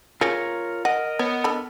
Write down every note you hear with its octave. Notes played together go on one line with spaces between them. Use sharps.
C#3 A#3 C#4 F4 A#4 C#5
A#4 D#5 F#5
B3 C#5
D3 B5